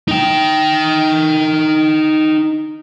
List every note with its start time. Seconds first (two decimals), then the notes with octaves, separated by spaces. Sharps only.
0.08 D#4 G5